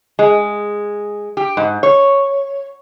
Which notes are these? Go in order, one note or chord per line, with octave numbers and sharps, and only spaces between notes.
G#3
G4
G#2
C#5